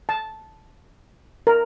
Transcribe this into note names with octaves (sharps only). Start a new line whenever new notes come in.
A5
A#4